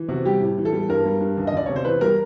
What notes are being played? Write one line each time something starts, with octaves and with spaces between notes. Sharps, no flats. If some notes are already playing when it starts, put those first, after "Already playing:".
Already playing: E3
C3 F#4
G3 G4
A2
E3
A4
G3
G2 A#4
G3
G2
C#2
D#5
C#2 D5
C3 C#5
C5
E3 B4
G3 A#4